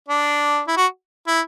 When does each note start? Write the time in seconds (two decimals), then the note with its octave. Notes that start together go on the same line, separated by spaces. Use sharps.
0.08 D4
0.67 E4
0.77 F#4
1.27 E4